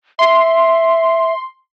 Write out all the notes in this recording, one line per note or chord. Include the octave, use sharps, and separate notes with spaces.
E5 C6